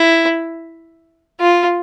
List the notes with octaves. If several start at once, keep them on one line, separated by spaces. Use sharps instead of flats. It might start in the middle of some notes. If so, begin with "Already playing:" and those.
Already playing: E4
F4